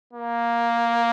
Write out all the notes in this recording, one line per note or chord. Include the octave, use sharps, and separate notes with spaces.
A#3